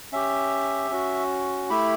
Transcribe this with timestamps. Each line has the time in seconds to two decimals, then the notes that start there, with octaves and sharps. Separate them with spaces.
0.12 C#4 G4 E5
0.91 C#4 F#4
1.70 A3 E4 G4 B5